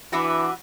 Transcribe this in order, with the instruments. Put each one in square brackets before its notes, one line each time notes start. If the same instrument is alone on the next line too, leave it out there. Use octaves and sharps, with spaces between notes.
[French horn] E3 [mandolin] D4 F#4 B4 E5